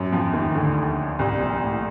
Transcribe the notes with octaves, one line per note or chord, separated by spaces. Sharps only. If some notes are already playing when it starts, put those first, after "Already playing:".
Already playing: F#2 F#3
F2 F3
D#2 D#3
D2 D3
C2 C3
A#1 A#2
A2